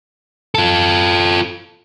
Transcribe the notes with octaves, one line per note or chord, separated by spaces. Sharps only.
F4 A4